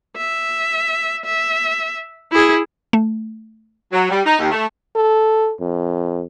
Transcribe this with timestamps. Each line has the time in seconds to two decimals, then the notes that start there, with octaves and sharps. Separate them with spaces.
0.17 E5
1.25 E5
2.32 E4 G#4
2.93 A3
3.92 F#3
4.10 G3
4.26 D#4
4.39 D#2
4.51 A3
4.95 A4
5.60 F2